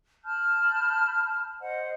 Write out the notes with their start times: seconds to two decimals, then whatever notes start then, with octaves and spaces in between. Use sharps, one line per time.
0.25 A5 B5 F6 G6
1.60 C5 D#5 F#5